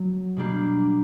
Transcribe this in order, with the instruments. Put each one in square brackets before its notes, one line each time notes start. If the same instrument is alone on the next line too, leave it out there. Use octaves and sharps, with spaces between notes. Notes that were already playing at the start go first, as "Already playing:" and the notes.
Already playing: [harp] F#3
B2 G3 A#3 D4 G4